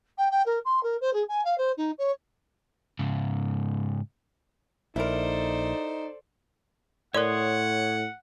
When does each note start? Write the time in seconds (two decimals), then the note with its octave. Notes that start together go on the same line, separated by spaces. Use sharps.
0.17 G5
0.30 G5
0.45 A#4
0.64 C6
0.83 A#4
1.00 C5
1.13 G#4
1.28 G#5
1.44 F5
1.57 C5
1.77 D#4
1.98 C#5
2.99 G#2 C#3
4.96 A#1 D#4 E4 A4 A#4 C5 D5
7.14 A2 A#4 C#5 D5 F#5 C6 D#6